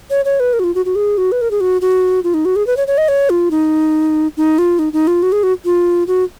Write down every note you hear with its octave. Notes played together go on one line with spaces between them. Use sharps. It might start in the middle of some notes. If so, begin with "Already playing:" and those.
C#5
C#5
B4
A#4
F#4
F4
F#4
F#4
G#4
F#4
B4
A#4
G#4
F#4
F#4
F4
D#4
F#4
G#4
B4
C#5
C#5
D#5
C#5
F4
D#4
D#4
F4
D#4
D#4
F4
F#4
G#4
F#4
F4
F#4